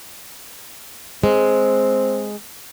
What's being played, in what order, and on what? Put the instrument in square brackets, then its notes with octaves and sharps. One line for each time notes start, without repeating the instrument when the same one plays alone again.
[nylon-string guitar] G#3 [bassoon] C4